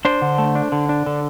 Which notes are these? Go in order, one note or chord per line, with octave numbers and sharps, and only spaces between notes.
D4 C5
D3
A3
D4
D3
D4
D3